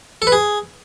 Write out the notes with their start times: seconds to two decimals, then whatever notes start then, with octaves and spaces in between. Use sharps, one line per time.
0.22 A4
0.27 B4
0.32 G#4